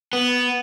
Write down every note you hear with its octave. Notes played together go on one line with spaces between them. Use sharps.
B3